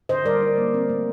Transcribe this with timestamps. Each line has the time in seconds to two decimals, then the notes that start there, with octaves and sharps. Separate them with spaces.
0.09 D3 C5 D#5
0.25 G3 A#4 D5
0.42 D#4
0.58 A#3
0.74 C4
0.89 A3